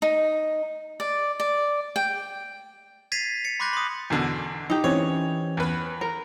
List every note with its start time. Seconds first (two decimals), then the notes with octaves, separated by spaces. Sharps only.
0.02 D#4
1.00 D5
1.40 D5
1.96 G5
3.12 G#6 A6 B6 C7 D#7 F7
3.44 A6 C#7
3.60 B5 C6 D6 F#6 G6 A#6
3.73 C6 D#6
4.10 E2 B2 D3
4.70 D#4 G4
4.84 E3 C4 C#4 C#5
5.57 E2 B4
6.01 A#4